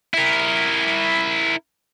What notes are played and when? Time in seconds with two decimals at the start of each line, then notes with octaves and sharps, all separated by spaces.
0.14 E4 A#4